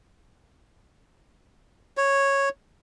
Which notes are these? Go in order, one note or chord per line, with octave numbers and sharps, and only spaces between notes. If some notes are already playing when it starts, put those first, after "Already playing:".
C#5